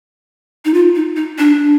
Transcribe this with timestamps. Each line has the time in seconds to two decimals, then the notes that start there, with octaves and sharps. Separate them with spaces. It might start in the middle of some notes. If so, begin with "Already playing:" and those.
0.65 D#4
0.74 F4
0.95 D#4
1.16 D#4
1.38 D4